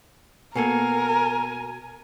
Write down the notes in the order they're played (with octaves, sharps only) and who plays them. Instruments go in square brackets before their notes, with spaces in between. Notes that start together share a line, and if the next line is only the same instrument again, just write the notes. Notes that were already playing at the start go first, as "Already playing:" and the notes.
[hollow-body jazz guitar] B2 A#3 A4 [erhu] A#4 [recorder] G#5